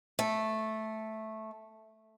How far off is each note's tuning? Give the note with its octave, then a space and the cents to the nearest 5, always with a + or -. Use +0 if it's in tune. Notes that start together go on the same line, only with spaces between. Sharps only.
A3 -5